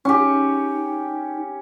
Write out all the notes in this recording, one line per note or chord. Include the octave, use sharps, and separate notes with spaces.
C#4 D#4 G4